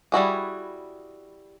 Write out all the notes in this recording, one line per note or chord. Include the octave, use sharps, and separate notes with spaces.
G3 E4 F#4 G#4